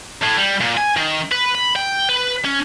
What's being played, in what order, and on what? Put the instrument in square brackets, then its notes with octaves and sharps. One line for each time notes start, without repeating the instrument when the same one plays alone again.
[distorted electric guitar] A2
G3
A#2
G#5
D#3
B4
B5
G5
B4
C#4